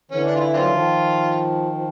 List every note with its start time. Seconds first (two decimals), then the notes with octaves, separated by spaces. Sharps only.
0.11 D3 E3 C#4
0.26 D4
0.35 F4
0.40 E4
0.54 F#3 C4 D4 F4
0.68 D#3 F3
1.73 F3